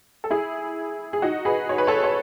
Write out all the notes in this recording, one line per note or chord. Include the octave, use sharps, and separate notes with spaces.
A4
E4 G#4
G#4
D#4 F#4
G#4 B4
C#5
B4
A4 C#5
C#5